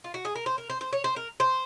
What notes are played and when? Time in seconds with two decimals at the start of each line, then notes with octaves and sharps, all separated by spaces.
0.04 F4
0.14 F#4
0.25 G#4
0.36 A#4
0.46 C5
0.58 A#4
0.70 C5
0.81 C5
0.93 C#5
1.04 C5
1.16 A#4
1.40 C5